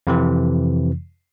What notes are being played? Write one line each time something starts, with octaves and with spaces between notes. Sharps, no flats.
F2 C3 E3